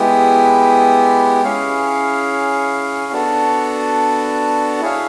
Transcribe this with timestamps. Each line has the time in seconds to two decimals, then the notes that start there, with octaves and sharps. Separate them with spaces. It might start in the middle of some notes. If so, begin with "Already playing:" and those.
Already playing: G#3 B3 E4 G4
1.44 C#4 E4 G#4 C#5 F5
3.12 B3 D4 F#4 A4
4.81 E4 G#4 C#5 F5